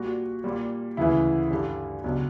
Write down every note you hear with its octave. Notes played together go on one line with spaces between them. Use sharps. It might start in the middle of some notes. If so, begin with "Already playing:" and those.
Already playing: A#2 G3 F#4
A#2 G3
D2 C#3 E3 E4
G2 D3 G3
C#2 B2 F#3 D4